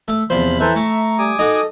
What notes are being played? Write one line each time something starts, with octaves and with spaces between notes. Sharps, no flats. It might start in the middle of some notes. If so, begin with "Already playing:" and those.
A3 A4
E2 C3 F3 C5 B5
E3 A4 B4 C5 E5 A#5
A3 C#6
G3 G#5 D6 D#6
D#4 F#4 A4 D#5